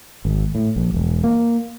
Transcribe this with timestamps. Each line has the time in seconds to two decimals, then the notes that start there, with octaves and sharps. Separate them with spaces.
0.25 G#1
0.55 A2
0.76 A#1
0.94 E1
1.24 A#3